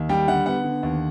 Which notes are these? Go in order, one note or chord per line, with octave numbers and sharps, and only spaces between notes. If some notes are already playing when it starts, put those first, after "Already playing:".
Already playing: D#2
G3 G5
D3 F#5
B3 F#5
D3
D#2